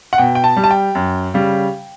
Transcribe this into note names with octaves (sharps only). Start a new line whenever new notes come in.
F#5
B2 G5
G5
A5
G3
A5
G5
F#2
C#3 G3